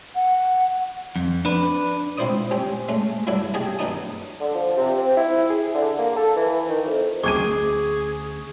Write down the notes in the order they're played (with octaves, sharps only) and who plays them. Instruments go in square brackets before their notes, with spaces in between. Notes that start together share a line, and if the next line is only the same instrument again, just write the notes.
[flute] F#5
[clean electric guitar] F2
D4 B4
[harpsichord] C#2 C4 E4 C5 D5 D#6
C4 C#4 G4
G#3 A3 C#4
A1 G2 F#3 E4 A4 D5
B1 G4 G#4 D#5 A5
F#2 B3 D4 D#4 A5 D#6
[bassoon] D3
F3
C3
C4
E4
G#4
D3
A#3
A4
E3
D#3
F2
[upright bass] D2 C#4 [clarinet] G#4 [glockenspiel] C#6 [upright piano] D6 G#6 D#7